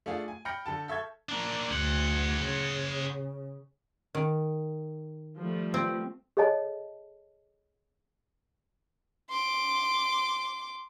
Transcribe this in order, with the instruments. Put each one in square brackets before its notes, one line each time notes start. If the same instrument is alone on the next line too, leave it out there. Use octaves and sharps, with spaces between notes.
[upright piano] A3 D4 F4 G#4
G#5
G5 B5 F6 G6 A#6 C#7
D3 A4 A5
A4 E5 C#6 G#6
[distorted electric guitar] A#3 D4
[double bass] D2 [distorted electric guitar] G#4 F#5
[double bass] C#3
[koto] D#3
[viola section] F3 G3 A3
[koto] C4
[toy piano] G#4 A4 C#5 D#5 G#5 A5
[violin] C6 D6